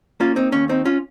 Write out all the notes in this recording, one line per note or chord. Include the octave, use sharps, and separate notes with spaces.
A#3 C#4 F4
C4 D#4
D#2 C#4
C4 D#4
C#4 F4